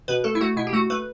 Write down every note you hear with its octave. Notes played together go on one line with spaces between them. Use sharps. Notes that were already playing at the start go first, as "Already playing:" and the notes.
B2 B4
A3 A4
E4
A3 F#4
B2 E4
G4
A3 F#4
A3 B4